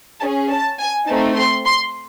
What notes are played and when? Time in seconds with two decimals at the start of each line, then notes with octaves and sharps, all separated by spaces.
0.21 G#4 A5
0.25 C#4
0.50 A5
0.79 G#5
1.07 A3 C4 D#4 A5
1.36 C6
1.65 C6